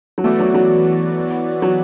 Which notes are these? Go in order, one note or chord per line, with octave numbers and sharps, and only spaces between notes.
F#3
E3 A3 B3 F#4 D5
F#3
F#3
F#3